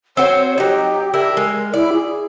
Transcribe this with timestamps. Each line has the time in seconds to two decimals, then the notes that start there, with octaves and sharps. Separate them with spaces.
0.17 C4 F#4 C5 C#5
0.58 F#3 D#4 G4
1.14 D4 E4 A#4
1.37 G#3 A#4
1.74 E4 D5
1.93 G#4